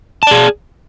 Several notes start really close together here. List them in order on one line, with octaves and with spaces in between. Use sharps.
A5 D5 G#4